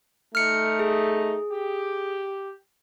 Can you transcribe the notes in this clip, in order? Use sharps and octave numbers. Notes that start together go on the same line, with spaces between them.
A3 D#4 F6 C#7
G#4
G4